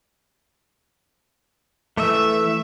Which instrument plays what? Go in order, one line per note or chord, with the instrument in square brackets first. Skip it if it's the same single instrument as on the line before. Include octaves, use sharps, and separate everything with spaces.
[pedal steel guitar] E3 A3 [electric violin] E5